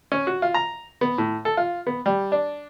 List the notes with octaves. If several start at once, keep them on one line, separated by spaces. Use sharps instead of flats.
C#4
F#4
F4
A#5
B3
A2
A4
F4
B3
G3
D4